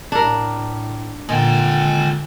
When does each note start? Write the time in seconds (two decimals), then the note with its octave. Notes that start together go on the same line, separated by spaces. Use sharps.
0.12 A2 D4 A#4
1.29 A#2 D3 G#3 G5